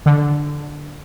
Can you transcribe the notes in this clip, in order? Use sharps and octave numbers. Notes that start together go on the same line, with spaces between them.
D3